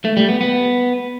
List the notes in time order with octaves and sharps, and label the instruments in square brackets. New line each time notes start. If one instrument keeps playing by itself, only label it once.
[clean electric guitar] A3
G3
B3
B3